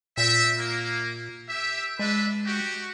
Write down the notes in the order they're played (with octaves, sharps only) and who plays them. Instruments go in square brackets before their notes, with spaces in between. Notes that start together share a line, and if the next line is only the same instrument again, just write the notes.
[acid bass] A#2 [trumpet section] C4 E5
[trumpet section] A#3
G4 E5
[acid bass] G#3 [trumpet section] D4 B4 E5
[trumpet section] F#4 G4